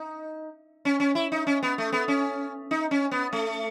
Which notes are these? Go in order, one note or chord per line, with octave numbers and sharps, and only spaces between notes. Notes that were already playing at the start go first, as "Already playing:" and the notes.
Already playing: D#4
C#4
C#4
E4
D#4
C#4
B3
A3
B3
C#4
D#4
C#4
B3
A3